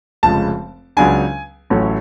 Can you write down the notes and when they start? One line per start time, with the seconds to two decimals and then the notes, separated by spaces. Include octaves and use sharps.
0.23 F1 F2 C#3 G#3 A5
0.97 C#2 C#3 F#3 B3 D4 G#5
1.70 A1 A2 F#3 A3 C#4